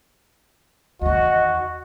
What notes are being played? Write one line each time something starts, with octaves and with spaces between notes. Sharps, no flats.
E2 D#3 F#4 D#5